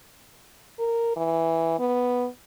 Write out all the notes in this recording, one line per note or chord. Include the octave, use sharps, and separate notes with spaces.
A#4
E3
B3